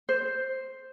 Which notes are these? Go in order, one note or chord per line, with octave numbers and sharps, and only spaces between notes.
C5